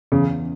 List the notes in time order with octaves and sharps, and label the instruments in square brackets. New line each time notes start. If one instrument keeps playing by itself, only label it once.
[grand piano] E2 [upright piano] C#3